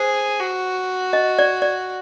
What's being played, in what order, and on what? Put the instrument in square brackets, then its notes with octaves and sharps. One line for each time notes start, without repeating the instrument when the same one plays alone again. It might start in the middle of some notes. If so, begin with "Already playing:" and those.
Already playing: [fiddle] G#4 [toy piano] C5
[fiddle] F#4
[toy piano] D#5
D5
D5